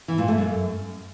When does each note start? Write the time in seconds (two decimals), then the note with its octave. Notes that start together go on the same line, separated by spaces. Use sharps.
0.08 E3
0.18 A#2
0.28 A3
0.38 F#2